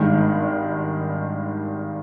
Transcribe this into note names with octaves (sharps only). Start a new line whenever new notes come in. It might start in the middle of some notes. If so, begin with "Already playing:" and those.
Already playing: G#1 G2 D#3 G#3